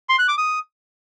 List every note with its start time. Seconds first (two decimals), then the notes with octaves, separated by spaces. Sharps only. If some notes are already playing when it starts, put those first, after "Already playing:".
0.09 C6
0.19 F#6
0.28 D6
0.38 D#6